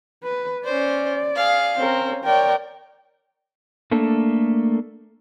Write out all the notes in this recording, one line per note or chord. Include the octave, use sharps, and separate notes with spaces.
B4
C#4 C5 D5
G#4 F5
C4 C#4 A#4
A#4 C#5 D5 G5
A3 A#3 D4 A4